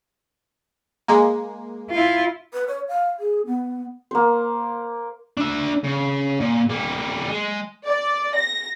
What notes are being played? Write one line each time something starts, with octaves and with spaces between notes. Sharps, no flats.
G#3 A#3
E4 F4
B4
C#5
F5
G#4
B3
A#3 C5
D4 E5
C#3
A#2
G3 A#3
G#3
D5
A#6